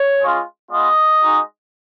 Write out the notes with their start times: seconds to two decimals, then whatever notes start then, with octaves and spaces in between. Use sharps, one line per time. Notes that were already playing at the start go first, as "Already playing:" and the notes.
Already playing: C#5
0.22 G#3 C#4 F4
0.71 G#3 B3 F4 D#5
1.21 G#3 D#4 F#4